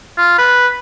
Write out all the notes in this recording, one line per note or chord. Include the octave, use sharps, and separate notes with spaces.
F4
B4